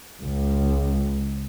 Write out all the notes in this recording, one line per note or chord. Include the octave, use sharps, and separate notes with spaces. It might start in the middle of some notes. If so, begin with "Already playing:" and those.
C#2